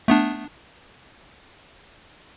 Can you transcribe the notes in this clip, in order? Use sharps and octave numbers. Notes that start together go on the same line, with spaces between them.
A3 B3 D4